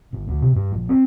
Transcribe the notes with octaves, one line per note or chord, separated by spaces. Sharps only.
G1
D2
C3
G2
A#1
C4